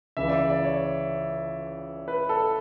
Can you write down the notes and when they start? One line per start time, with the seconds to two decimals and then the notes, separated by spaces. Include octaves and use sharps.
0.17 C#2 C#3 E3 E5
0.28 D5
0.32 E5
0.50 D5
0.64 C#5
2.08 B4
2.29 A4